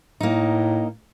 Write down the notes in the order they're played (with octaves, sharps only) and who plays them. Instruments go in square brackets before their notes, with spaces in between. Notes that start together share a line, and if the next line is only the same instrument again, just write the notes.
[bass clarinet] A2 [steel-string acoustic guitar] A#3 D#4